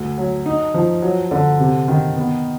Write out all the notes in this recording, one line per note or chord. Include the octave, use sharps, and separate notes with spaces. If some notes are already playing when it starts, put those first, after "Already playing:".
Already playing: D2
F#3
D#4
F3
F#3
D3
C3
D#3
B3